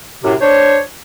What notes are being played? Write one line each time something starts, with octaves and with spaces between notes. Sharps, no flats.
F#2 A2 C3
D4 C5 C#5